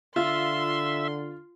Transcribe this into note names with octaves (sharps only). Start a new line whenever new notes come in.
D3 F4 E5 C6